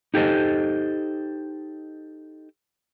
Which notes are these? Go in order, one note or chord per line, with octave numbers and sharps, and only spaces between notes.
D#4 G4 A4 C5 D#5